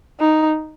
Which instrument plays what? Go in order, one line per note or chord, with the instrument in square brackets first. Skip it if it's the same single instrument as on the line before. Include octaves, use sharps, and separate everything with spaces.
[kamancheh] D#4